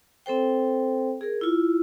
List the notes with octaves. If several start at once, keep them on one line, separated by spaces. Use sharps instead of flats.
C4 A4 C5 G5
G#4 A#4
E4 F4